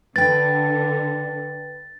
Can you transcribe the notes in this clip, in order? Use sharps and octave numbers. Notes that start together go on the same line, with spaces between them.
D3 B4 G5 A6